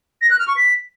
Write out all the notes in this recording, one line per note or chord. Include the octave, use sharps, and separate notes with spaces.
A#6
F#6
F6
C#6
B6